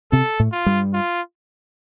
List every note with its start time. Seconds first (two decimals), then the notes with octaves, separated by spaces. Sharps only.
0.12 C3 C4 A4
0.39 A2 A3
0.52 F4
0.66 G2 G3
0.93 F4